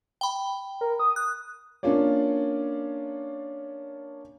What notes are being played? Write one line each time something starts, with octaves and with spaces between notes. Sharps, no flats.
G5 B5
A#4
D#6
F#6
A#3 C#4 D4 F4 C#5 D5